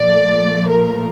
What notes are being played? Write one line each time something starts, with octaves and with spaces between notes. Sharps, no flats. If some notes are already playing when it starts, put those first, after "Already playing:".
Already playing: A#2 F3 A3 D5
A#4